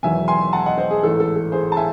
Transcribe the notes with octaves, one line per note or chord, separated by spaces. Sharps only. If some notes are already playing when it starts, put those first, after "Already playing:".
E1 E2 D#3 F#3 E5 G#5
G#5 C6
F#5 A5
D#5 F#5
C5 D#5
G#4
A1 G#2 E3 A4
A4
A4
G#4 C5
A5
E5 G#5